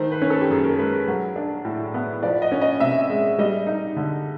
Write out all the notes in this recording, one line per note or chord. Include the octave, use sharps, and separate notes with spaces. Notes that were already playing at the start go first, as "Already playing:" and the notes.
Already playing: D#3 A3 C5
B4
C#4
A4
G4
F#2 G#4
A#4
G#3 B4
A#4
F#3
D4
A2
B3
F3 D5
D#5
C#4
D#5
C3 E5
G#3
G3 D#5
D#4
D3